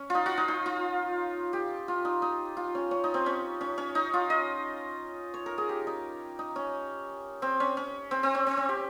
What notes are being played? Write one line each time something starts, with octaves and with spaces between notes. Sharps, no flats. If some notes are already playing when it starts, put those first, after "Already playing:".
Already playing: C#4
D#4 F4
F4
D#4
D#4
F4
G4
F4
D#4
D#4
F4
C#4
C#4
D#4
C4
C#4
C#4
C#4
D#4
F4
D#5
C#5
A#4
G#4
G4
D#4
D#4
C#4
C4
C#4
C#4
C4
C4
C#4
C4
C#4
G4